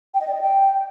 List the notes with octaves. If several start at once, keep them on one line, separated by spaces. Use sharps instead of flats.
G5
D#5
D5
D#5
G5